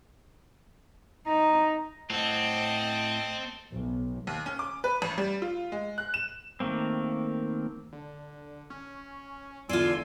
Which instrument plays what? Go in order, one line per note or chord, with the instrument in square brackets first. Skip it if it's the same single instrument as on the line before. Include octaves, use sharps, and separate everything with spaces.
[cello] D#4
[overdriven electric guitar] A2 F#5 [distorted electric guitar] C4 [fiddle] A4 D#5
[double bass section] B1
[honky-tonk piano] D#2
C#4
D6
B4
A1
G3
F4
G#3
F#6
E7
[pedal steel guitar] D#3 A3 A#3 C4
[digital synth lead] D3
C#4
[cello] E2 D3 [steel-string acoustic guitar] F4 D5 [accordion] G#5 C6 E6